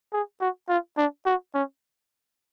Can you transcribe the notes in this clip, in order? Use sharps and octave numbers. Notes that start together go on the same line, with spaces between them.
G#4
F#4
F4
D4
F#4
C#4